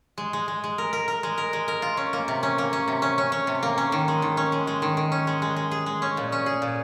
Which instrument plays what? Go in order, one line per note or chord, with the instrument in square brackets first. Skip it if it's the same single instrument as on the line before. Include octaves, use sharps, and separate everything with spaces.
[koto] G#3
G#3
G#3
G#3
A#4
A#4
A#4
G#3
A#4
G#3
A#4
F4
C#4
A#3
C3
C#4
A#3
C#4
C3
C#4
C#4
C#4
C3
A#3
C#4
D#3
G#3
D#3
C#4
G#3
G#3
D#3
D#3
C#4
G#3
G#3
G#3
G#4
G#3
C#4
A#2
C#4
G#4
A#2